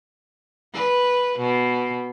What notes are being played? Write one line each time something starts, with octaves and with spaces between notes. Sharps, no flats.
B4
B2